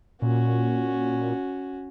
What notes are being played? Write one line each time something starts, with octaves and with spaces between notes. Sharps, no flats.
A#2 C#4 F#4